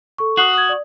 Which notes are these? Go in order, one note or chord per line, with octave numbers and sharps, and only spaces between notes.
A4 C#6
F#4 D#6 F#6 C7
D#6 G#6
D5